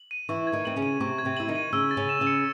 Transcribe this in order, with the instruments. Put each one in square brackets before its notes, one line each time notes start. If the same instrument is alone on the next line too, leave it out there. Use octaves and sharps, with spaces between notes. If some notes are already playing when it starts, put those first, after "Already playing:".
Already playing: [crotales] F#7
D#7
[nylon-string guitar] E3 E4 [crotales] C#6
[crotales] G#6
[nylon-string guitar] D#3 D#4
[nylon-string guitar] C4 [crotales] F#7
[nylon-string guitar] C#3 C#4
[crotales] D#7
[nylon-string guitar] C3 C4 [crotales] C#6
[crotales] G#6
[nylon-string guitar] C3 C4
[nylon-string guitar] E4 [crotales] F#7
[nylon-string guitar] D#3 D#4
[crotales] D#7
[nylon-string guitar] C#3 C#4 [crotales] E6
[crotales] A6
[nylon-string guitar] C#3 C#4
[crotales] E7
[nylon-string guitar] C#3 C#4
[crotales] C#7